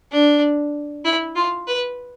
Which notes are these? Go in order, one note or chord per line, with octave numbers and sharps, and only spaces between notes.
D4
E4
F4
B4